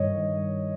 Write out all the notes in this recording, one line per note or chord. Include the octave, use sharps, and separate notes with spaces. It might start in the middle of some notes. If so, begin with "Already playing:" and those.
Already playing: G2 D#3 G3 C#5 D#5